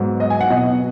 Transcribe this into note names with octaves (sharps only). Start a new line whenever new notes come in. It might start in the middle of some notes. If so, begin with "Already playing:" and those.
Already playing: G#2 F#3 B3
D#5
G#5
F#5
B2 F#3 B3 D#5